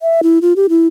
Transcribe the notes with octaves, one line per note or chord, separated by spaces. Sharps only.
E5
E4
F4
G4
E4